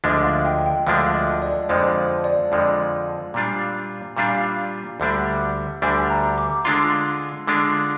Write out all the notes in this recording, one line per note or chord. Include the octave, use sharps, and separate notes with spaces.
D2 D3 F3 G#3 D4 D#5
F5
G5
G5
D2 D3 F3 G#3 D4 F5
D#5
D5
F2 D3 F3 G#3 C5
D5
F2 D3 F3 G#3
A#2 G3 D4 F4
A#2 G3 D4 F4 F5
D2 D3 G3 D4
D2 D3 G3 D4 G#5
A#5
D6
D3 G#3 D4 F4 C6
D3 G#3 D4 F4